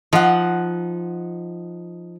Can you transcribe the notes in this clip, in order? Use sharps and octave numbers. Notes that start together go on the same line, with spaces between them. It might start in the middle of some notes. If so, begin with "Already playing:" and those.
F3 D#4 F#5